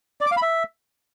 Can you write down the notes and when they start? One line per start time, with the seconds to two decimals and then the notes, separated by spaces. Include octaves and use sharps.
0.21 D5
0.26 D6
0.32 F5
0.37 B5
0.42 E5